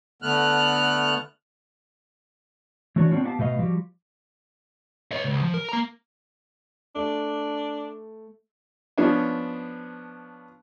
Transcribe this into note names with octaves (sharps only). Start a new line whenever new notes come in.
D3 A3 B3 F6 F#6
E3 A3 D4 F#4 C#5 D5
B3 C4 D4 F4 C#5
B3 D4 G4 F5 A5
B2 A3 B4 D#5 F5
F3 G3 F#4 G4
C#5 D#5
C#2
F3
A#4
A#3 A#5
A3 D4
F3 B3 C#4 D4